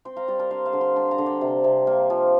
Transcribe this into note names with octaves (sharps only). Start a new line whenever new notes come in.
C4 G5 C6
F5 A#5
G3 D5 G5
A#4 D5
D4 C5 F5
C5 F5
D3
G5 C6
D4 G5 C6
F5 A#5
D3
D5 G5
C3
C3
A#3
F3